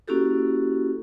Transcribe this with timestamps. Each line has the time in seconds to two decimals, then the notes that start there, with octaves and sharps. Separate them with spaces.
0.08 A#3 C#4 E4 F#4 G4 A4